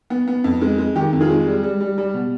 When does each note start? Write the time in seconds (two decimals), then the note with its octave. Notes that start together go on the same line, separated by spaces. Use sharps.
0.10 B3
0.28 B3
0.44 F2
0.62 G#3
0.78 G#3
0.95 D#3 G4
1.13 F2
1.21 F4 G#4
1.30 G#3
1.47 G3
1.63 G3
1.80 G3
1.98 G3
2.14 B2